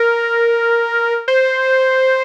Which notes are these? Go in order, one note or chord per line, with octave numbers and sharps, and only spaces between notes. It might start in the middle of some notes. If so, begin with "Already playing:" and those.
Already playing: A#4
C5